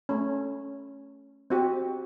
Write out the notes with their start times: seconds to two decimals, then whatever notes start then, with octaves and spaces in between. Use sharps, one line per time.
0.09 A3 C#4
1.50 C4 F#4 G4